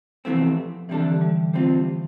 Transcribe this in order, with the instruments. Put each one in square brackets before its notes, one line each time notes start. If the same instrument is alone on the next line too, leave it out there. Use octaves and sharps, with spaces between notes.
[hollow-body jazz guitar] E2 C3 E3 A3 C4 [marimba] F3
[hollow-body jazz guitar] C3 G3 D4 A4 [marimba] E3
[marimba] D3
E3
G3
[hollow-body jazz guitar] C3 G3 C4 F4 [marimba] A3